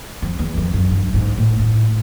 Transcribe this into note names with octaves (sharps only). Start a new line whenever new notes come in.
F2
E2
F2
F#2
G2
G#2
A2
A2